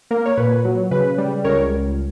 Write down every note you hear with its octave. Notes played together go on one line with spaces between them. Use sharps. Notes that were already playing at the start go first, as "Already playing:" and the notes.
A#3 A#4
C#5
A#2 B4
F#3
C#3 B4
G3
C#2 A#4 C#5